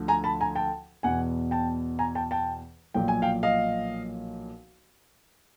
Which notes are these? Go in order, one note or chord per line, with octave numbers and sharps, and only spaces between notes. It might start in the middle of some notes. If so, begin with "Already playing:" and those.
Already playing: D2 D3 F3
G#5 A#5
A5 B5
G#5 A#5
G5 A5
E2 B2 F#5 G#5
G5 A5
G#5 A#5
G5 A5
G5 A5
B1 A#2 F3 G5
G#5
F5 G5
D#5 F5